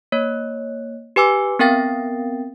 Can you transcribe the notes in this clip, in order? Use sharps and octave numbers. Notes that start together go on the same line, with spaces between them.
A#3 C#5
G4 B4 G#5 D6 E6
B3 C4 A#4 F5 G5 A6